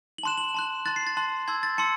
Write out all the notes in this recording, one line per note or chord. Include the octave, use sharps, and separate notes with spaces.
F#7
A5 C6 F#6 E7
F#7
A5 C6 F#6
A5 C6 F#6 A6
C7
A6
A5 C6 F#6
A5 C6 E6 G#6
A6
A5 C6 E6 C#7